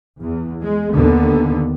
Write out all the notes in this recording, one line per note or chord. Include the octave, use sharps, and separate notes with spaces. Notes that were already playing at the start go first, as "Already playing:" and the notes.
E2
G#3
D#2 D3 B3